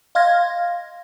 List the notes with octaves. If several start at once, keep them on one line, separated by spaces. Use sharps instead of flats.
D#5 F5 C6 F6 G#6 A#6